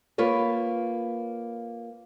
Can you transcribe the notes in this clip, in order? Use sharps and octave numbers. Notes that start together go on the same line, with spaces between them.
A#3 F4 B4 C#5